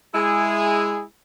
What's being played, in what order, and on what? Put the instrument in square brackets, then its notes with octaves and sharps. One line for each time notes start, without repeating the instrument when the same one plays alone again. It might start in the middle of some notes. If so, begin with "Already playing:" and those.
[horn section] G#3 E4 G#4